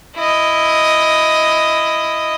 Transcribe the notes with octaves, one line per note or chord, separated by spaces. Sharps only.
E4 D#5